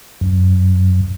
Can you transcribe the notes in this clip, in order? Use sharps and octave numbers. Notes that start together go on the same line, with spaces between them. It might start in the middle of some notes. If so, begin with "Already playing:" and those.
F#2